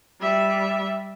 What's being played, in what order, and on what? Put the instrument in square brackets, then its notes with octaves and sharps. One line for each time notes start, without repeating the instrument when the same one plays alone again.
[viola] G3 E5